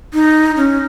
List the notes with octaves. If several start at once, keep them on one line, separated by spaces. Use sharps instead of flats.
D#4
C#4